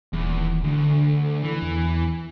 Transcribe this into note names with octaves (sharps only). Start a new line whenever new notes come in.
D#1 E2
D2 D3
E3
E2